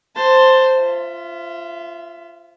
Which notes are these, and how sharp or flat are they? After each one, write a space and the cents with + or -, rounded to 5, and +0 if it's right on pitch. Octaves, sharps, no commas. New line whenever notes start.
C5 +0 A5 +15
F4 -15 E5 +15